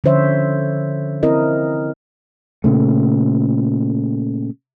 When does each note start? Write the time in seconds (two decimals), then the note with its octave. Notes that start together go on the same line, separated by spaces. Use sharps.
0.04 D3 F3 C#4 C5 C#5 E5
1.23 C4 E4 A#4 D#5
2.64 A#2 C#3 A3